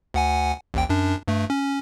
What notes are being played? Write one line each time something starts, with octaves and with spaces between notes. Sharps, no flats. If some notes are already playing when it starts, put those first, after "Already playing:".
D2 F#5 G#5
A1 D#2 G5
F#2 D4
G2 A3
C#4